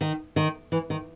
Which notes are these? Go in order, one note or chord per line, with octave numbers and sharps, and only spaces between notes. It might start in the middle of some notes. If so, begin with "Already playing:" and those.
D#3
D#3
E3
D#3